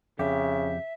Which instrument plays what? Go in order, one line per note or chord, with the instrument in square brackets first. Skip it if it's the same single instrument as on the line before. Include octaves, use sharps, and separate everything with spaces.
[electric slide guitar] F2 G4 [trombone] C#3 [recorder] E5